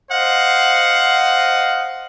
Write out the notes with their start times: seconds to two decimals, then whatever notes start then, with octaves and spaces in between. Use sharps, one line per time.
0.11 C5 D#5 F5 F#5